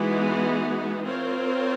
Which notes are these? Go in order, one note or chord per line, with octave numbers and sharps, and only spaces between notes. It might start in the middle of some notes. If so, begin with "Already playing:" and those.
Already playing: E3 G#3 B3 D#4 F#4
C4 F4 A#4 C#5